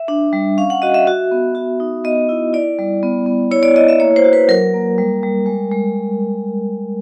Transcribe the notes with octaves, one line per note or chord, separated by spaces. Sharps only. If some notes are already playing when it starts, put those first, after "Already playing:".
Already playing: E5
D4
G3
C#4 F5
F#5
F#4 D#5
E5
F#4 E5
B3
F#4
D#4
B3 D#5
E4
E4 D5
G3
B3
B3
E4 C#5
D5
E4 D#5
E5
A#3 C#5
C5
F#4
B4
F#3 A#4
A#3
G3
G3
G#3
G#3